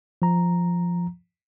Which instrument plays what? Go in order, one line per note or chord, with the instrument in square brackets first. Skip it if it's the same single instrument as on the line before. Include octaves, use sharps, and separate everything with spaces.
[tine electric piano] F3 A#5